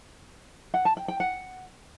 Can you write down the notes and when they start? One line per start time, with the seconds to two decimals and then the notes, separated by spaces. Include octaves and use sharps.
0.74 F#5
0.85 A5
0.97 G5
1.08 G5
1.20 F#5